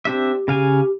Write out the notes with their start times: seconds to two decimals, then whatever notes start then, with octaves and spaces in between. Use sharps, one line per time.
0.05 C4 D4 G4 E5
0.48 C#3 G4 F5 G#5